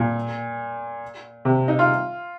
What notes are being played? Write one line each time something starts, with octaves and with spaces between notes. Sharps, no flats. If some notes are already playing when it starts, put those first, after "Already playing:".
Already playing: A#2
C3
D#4
F4